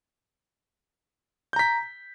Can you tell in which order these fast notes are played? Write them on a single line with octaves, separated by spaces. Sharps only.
G6 A#5 B6